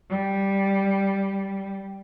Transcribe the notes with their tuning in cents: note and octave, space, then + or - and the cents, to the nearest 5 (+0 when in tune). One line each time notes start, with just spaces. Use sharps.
G3 +0